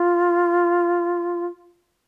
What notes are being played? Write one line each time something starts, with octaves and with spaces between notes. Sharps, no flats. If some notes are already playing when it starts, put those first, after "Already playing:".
Already playing: F4